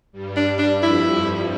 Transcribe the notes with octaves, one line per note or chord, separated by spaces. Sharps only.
G2 G3
D4
G2 G3
D4
F2 F3 E4